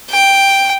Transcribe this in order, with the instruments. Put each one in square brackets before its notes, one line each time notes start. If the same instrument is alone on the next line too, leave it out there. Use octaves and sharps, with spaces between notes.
[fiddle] G5